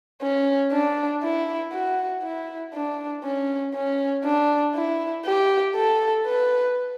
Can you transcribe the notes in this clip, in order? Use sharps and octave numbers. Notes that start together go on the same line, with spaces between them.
C#4
D4
E4
F#4
E4
D4
C#4
C#4
D4
E4
G4
A4
B4